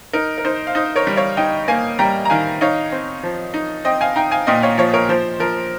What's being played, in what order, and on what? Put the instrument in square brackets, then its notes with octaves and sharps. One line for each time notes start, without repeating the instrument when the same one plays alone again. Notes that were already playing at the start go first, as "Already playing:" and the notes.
[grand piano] D#4 A#4
A#4
D#4 C5
F5
D#4 C5 D#5
A#4 C#5
G3
C#5 F5
D#4 D#5 G5
A#3 F5 G#5
G3 G5 A#5
A#5
D#3 F5 G#5
D#4 C#5 F5
C4
F3
D#4
C4 D#5 G5
F5 G#5
D#4 G5 A#5
F5 G#5
A#2 D#5 G5
C#5 F5
F3 C#5 F5
A#4 C#5
F3 C5
F3 A#4